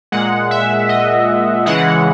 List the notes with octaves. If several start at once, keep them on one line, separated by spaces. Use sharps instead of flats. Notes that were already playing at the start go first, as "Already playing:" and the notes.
A#2 G#3 F#5
E5
D#5
C#3 E3 G#3 F#5